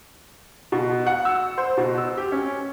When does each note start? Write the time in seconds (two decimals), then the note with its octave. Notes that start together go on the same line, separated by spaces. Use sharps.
0.72 B2
1.07 F#5
1.25 E6
1.58 C5
1.77 B2
1.98 E6
2.17 G4
2.32 C#4